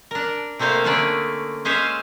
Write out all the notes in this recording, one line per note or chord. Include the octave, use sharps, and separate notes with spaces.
D4 A#4
C3 A3 A#3 C5 F5
D3 A3 A#3 C#4 D4 D5
G#3 C#4 C5 E5 F5